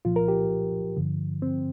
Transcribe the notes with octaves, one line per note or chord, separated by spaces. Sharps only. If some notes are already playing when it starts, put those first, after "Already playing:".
C2 A#2 F3 F4
A#4
G4
G2 D3 F3
C4